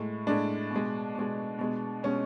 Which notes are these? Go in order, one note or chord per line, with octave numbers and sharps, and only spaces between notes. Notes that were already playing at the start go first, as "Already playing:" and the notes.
Already playing: A2 G#3
A2 G#3 D4
B2 G#3
B2 G#3
B2 G#3
B2 G#3 C#4